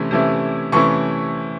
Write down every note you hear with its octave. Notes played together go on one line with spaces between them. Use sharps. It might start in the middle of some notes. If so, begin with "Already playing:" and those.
Already playing: C3 E3 A3 C#4
C3 E3 A3 C#4 E4
C3 E3 A3 C#4 E4 C#6